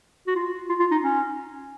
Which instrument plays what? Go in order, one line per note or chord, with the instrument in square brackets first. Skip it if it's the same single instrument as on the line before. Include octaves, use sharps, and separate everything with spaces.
[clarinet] F#4
F4
F4
F4
D#4
C#4